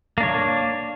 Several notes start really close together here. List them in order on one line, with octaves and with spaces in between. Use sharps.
A#3 D4 C#5